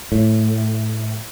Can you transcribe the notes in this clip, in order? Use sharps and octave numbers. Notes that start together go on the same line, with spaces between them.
A2